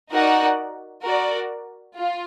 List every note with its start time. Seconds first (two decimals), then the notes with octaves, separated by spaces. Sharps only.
0.13 D#4 F#4 A#4 D5 F#5
1.04 F#4 A#4 D5
1.96 F4